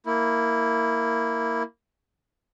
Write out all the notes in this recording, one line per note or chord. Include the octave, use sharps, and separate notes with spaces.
A#3 E4